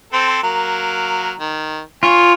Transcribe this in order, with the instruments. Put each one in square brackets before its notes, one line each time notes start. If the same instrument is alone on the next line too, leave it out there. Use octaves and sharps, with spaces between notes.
[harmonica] C4 A4 C5
F#3 A#3 A#4
D#3
[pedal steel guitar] F4 [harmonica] C#5 G#5